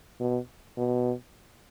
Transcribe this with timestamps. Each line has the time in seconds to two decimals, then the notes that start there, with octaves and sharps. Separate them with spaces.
0.20 B2
0.78 B2